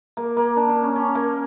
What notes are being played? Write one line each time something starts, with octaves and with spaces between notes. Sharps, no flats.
A#3
A#3
D4
D4
C#4
C#4
A#3